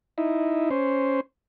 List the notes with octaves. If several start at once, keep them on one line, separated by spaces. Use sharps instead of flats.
D#4 E4
C#4 C5